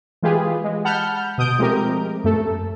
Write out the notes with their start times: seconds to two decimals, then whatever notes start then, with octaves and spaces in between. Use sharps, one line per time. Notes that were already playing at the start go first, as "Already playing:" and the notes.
0.23 E3 G#3 F4 G4 G#4 B4
0.64 G#3
0.85 F#5 A5 B5 F6 G6
1.38 B2 D#6 G6 D7
1.58 F3 G#3 A3 C4 G4 A#4
2.24 F#2 A3 A4